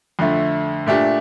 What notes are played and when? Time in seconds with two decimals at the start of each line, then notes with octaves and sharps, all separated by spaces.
0.19 F2 D3 A3
0.87 A#2 A3 D4 G4